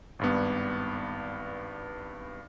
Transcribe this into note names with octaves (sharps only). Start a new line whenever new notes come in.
G#1 G2 B3